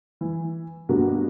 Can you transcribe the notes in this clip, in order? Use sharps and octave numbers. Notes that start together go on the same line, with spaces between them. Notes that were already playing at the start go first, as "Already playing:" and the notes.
E3
G2 B2 A#3 F#4